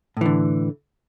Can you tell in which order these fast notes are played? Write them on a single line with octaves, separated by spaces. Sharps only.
A2 E3 D3